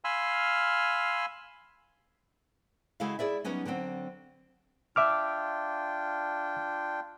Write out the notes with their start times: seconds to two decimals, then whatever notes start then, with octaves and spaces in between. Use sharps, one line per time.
0.04 F5 G#5 B5 C6 E6 F6
3.00 C#3 G#3 E4 F#4 A4 F5
3.19 E4 G#4 D5 E5
3.44 F#3 G3 B3 C#4 D#4
3.65 D3 F#3 A#3 C4
4.96 D4 F4 E5 G5 D6 F6